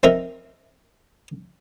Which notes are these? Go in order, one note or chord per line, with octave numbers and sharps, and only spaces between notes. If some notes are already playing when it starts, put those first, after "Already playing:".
C4 D#4 A#4 E5